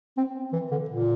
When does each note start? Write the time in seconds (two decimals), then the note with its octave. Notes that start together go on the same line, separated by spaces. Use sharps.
0.17 C4
0.53 E3
0.71 D3
0.89 A#2